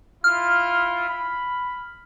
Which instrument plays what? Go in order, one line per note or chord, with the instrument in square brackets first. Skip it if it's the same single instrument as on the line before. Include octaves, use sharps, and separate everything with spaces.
[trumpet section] E4 F4 [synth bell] F6
[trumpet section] B5